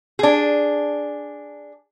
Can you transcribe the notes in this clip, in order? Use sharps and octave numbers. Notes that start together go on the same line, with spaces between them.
D4 G#4